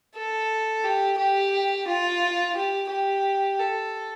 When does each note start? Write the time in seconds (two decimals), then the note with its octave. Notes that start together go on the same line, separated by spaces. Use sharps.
0.16 A4
0.85 G4
1.18 G4
1.88 F4
2.57 G4
2.90 G4
3.59 A4